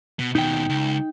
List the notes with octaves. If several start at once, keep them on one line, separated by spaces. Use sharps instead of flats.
B2
D#2 B2 D#4 G5
C#2